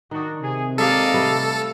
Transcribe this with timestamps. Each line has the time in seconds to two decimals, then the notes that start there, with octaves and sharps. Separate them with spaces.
0.11 D#3 D4 D#4 F#4
0.42 C3 G#4
0.78 G#3 A#3 G4 A4 D5 D#5 F5
1.14 G3 A3 B4